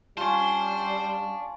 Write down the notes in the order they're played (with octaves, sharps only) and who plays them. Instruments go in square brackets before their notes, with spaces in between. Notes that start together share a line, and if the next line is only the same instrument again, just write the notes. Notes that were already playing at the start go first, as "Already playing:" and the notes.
[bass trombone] G3 [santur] C#4 F4 [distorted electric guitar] C5 [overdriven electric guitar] D5 A5